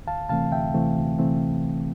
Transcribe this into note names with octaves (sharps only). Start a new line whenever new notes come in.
D2 F5 A5
C3 E3 A3 C4 F5 A5
D2 E5 G5
C3 E3 A3 C4
D2
C3 E3 A3 C4